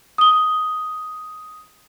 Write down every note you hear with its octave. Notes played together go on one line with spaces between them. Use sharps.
D#6 G7